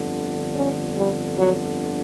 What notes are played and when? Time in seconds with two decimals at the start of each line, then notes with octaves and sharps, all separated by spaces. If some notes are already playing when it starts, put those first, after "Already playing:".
Already playing: G1 F2 D3
0.55 C#4
0.96 G3
1.37 F#3